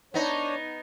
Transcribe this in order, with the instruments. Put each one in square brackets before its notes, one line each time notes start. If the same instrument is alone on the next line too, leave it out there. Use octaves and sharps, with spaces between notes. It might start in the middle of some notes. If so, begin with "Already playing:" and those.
[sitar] B3 D#4 [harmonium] D4 C#5